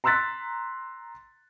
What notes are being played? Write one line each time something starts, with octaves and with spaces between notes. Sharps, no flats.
A#5 C6 E6 F#6 A6 B6